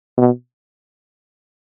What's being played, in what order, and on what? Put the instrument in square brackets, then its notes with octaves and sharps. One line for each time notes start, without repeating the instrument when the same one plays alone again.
[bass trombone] B2